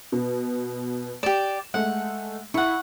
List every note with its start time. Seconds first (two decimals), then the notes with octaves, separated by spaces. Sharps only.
0.12 B2 B3
1.23 G4 D5 E7
1.74 G#3 A3 F#5
2.54 E4 F#5 C#6